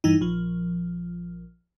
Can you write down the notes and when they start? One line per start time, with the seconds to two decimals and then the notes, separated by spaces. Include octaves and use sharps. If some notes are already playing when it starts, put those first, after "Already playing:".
0.04 G2 E3 D#4
0.21 A#1 F3